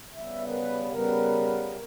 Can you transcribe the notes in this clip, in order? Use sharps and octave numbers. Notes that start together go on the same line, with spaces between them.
C#3 G3 B3 E5
A#4
B4
C#3 G3 B3 A#4
B2 A#3